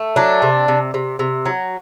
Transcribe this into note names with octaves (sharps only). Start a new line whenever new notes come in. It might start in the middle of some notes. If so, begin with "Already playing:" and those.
Already playing: A3
F#3 D4
C3
C3
C3
C3
F#3